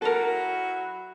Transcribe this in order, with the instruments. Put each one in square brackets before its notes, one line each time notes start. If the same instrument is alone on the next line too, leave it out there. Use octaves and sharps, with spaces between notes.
[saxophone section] F#3 E4 F#4 [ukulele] A4 A#4